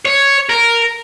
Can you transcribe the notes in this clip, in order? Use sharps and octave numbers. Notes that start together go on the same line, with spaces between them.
C#5
A#4